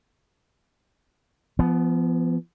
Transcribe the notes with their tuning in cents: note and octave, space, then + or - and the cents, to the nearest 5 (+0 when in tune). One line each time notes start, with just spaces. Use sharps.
F3 -30 B3 +10